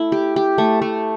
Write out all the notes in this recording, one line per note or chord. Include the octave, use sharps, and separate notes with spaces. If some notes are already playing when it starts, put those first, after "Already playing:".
Already playing: A3 E4
G4
G4
A3
A3